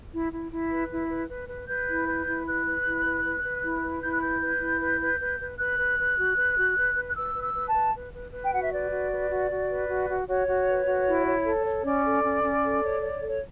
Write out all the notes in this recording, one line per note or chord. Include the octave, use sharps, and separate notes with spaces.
E4
E4
E4
B4
E4
B4
B4
B4
B4 G6
E4
B4
E4
B4 F#6
B4
E4
B4
B4
B4
E4
B4
E4 G6
F#6
B4 G6
B4
E4
B4
B4
B4
B4
B4 F#6
B4
B4
F#4
B4
F#4
B4
B4
F#6
B4 E6
B4
E6
B4
A5
B4
B4
B4
B4
G5
F#4 F#5
E5
B4 D5
F#4
B4
F#4
F#4
B4
F#4
F#4
F#4 C#5
F#4
B4
F#4
E4
C#5
A4
C#5
C#4 D5
A4
C#4
C#4
A4
C#5
C#5
A4
C#5